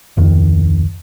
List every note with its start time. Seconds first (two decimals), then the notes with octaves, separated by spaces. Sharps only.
0.17 D1 F2 D#3